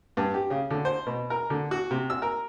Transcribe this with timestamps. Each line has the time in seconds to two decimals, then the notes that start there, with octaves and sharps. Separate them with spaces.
0.17 G2
0.34 G4
0.50 C#3
0.70 D3
0.85 C5
1.07 B2
1.30 A#4
1.50 D3
1.71 F#4
1.91 C3
2.10 E6
2.22 A#4